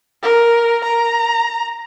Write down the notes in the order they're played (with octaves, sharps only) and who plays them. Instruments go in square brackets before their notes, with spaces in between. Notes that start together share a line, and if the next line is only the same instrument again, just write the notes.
[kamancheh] A#4
A#5